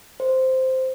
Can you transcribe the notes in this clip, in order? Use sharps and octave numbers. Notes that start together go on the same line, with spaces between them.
C5